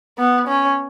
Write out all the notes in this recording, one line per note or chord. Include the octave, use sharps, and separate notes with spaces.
B3
C#4